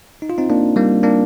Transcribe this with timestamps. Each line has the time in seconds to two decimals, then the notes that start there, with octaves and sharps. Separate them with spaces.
0.22 D#4
0.30 F4
0.38 C4 D#4
0.50 A#3 D4
0.76 G3 A#3
1.03 A#3 D4